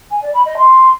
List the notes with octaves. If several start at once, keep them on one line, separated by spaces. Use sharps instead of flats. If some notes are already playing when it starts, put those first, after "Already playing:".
G#5
D5
B5
D#5
C6